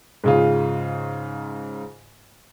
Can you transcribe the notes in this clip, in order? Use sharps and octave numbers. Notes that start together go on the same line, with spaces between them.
G#2 C#3 F4